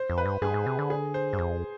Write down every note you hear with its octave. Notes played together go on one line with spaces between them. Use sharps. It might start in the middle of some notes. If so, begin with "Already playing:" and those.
Already playing: C5
F2
B4
G2
G2 G#4
G#2
C3
D3
G#4
C5
G2
F2